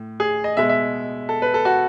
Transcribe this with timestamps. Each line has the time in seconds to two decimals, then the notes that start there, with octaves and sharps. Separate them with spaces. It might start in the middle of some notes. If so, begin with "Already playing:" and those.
Already playing: A2
0.20 G#4
0.44 D#5
0.57 B2 G#3 E5
0.69 E5
1.29 A4
1.42 B4
1.54 A4
1.65 F#4